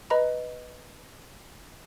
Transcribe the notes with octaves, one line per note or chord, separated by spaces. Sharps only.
B4 D#5 A#5 B5